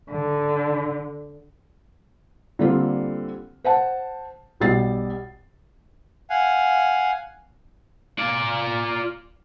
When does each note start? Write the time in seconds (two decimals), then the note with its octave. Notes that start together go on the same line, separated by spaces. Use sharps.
0.11 D3
2.59 D3 G3 A#3 C4 F4 A4
3.64 C5 F#5 A5
4.60 B1 B2 G3 A6 C7
6.30 F5 F#5 G#5
8.19 F4 D5